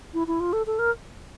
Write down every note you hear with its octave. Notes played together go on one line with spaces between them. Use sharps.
E4
E4
F4
A4
A4
A#4